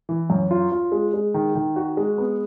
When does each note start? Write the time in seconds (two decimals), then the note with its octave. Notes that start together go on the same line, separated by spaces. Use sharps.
0.09 E3
0.30 F#2
0.51 F4
0.72 F4
0.92 G#3
1.14 G#3
1.34 D#3
1.55 D#3
1.76 F#4
1.97 G#3
2.18 B3